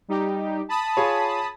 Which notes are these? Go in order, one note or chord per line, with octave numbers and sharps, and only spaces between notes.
G3 D#4 G4
A5 B5 D#6
F4 G#4 C#5